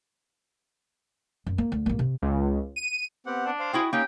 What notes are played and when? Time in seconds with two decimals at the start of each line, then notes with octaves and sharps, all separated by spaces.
1.47 F#2
1.58 A#3
1.72 D2
1.86 A1 A#3
1.99 C3
2.22 C#2
2.76 D#7
3.26 B3 C4 G4 F#5
3.46 D4
3.59 C5 F5
3.73 E4 F#4 G#4 G5
3.93 A#3 C#4 D#4 G4 G5